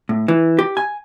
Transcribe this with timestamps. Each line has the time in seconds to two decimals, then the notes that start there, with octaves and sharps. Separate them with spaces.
0.09 A2
0.28 E3
0.59 G4
0.77 G#5